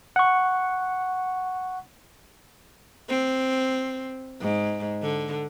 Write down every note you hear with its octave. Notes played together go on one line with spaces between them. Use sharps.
F#5 C#6
C4
G#2
D3